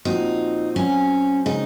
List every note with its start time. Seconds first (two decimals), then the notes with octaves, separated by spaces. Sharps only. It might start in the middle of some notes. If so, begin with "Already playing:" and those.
0.05 A#2 F3 C4 D#4 F#4
0.75 F#3 C4 C#4 F#4
1.45 C#3 G#3 C4 D#4